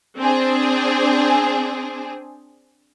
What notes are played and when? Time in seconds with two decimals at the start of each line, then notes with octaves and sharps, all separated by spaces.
0.17 C4 D4 G#4